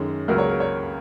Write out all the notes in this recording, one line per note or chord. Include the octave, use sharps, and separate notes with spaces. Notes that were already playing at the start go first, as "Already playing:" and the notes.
Already playing: F#2 D#3 G#3 C#4
C#2 C#3 F#3 A#3 A#4
C#5
A#4
C#5